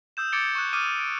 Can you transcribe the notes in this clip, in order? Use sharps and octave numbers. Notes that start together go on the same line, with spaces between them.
D#6 E6 G6 E7
D6 G#6 A6 C#7 D7 G7
C#6 F#6
D6 D#6 F6 D#7
D7